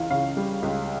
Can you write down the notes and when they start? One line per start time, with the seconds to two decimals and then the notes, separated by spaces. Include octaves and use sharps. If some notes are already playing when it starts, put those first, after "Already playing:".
Already playing: C#2 E3 F5
0.10 C#3 F5
0.37 G3
0.62 C#2